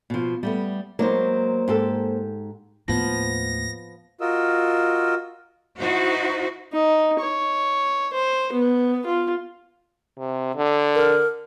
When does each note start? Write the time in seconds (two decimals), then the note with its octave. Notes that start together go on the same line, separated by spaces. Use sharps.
0.10 B2 F3
0.43 G3 A3 B3
0.99 F#3 G#3 A#3 B3 C5
1.68 G#2 G4 A4
2.88 D#2 A2 F3 B3 A#6
4.21 F4 F#4 A#4 D#5 E6
5.79 D#4 E4 F#4 C5
6.73 D#4
7.20 C#5
8.13 C5
8.53 B3
9.06 F4
10.18 C3
10.56 D3
10.95 A#4